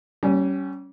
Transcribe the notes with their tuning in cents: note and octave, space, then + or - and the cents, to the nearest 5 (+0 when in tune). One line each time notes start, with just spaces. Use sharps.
G3 -35 C#4 +0